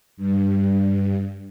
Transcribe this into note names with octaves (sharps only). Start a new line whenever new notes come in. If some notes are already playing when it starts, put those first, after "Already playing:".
G2